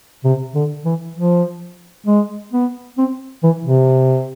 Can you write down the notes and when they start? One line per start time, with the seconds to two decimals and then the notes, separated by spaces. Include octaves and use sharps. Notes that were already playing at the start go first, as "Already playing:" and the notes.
0.25 C3
0.55 D3
0.85 E3
1.16 F3
2.07 G#3
2.52 B3
2.98 C4
3.43 E3
3.66 C3